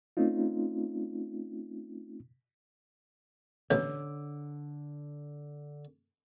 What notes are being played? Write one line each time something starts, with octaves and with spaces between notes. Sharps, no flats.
A3 C4 C#4 D#4 F4
A1 B2 D3 C#5